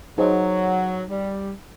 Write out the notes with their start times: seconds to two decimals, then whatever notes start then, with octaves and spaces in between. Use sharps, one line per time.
0.18 F#3 D#4 G#4 C5 D#5 F#5
1.10 G3